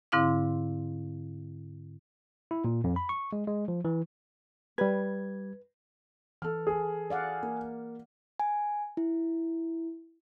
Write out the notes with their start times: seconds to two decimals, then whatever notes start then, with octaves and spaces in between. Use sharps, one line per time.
0.12 G#2 D3 C4 E4 F5 D6
2.51 E4
2.65 A#2
2.84 F2
2.96 B5
3.09 C#6
3.33 G#3
3.47 G#3
3.68 F3
3.85 E3
4.78 G3 B4 G#6
6.42 E3 A4 F6
6.67 G#4
7.10 D5 F5 F#5
7.43 A#3
8.40 G#5
8.97 E4